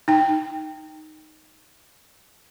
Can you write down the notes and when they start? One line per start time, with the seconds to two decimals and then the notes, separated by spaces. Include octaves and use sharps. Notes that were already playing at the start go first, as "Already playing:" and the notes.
0.08 D#4 G5